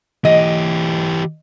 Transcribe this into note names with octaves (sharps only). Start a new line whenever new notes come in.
E3 G4 D#5